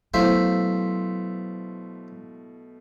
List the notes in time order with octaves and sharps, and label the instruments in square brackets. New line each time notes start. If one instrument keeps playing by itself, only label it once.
[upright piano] B2 A3 [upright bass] F#3 [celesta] E4 F5 [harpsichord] C5 E5